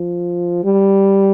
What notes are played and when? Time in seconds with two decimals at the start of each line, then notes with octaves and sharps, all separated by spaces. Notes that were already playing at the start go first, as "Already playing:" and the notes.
Already playing: F3
0.64 G3